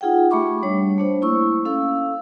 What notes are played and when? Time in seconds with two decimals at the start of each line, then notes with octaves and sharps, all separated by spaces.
0.01 D#4 F4 G#4 F#5 G5
0.31 A3 G4 E5 B5 C#6 D6
0.63 G3 D4 C#5
0.98 A3 D4 C5
1.22 A#3 E4 C#6 E6
1.65 C#4 A4 F5 E6